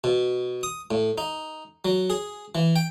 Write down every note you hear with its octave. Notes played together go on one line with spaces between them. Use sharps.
B2
D#6
A2
D#4
F#3
G#4
E3
G5